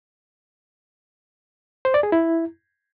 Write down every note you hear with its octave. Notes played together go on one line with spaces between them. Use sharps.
C5
D5
G#4
E4